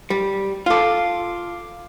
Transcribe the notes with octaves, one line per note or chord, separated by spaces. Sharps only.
G3
F4 A4 F5 D6